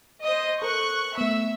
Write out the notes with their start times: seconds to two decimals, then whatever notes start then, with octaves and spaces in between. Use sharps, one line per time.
0.23 C5 D#5
0.62 A4 A#4 C5 C#6 F#6
1.18 A3 B3 E5 E6